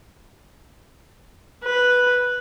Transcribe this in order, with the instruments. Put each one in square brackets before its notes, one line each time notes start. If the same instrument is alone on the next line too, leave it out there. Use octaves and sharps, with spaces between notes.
[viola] B4